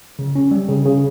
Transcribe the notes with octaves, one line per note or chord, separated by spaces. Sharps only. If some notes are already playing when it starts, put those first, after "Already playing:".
C#3
C#4
G3
C#3
C#3